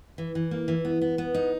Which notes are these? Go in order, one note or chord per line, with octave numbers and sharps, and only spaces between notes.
E3
E3
A#3
E3
B3
B3
B3
D#4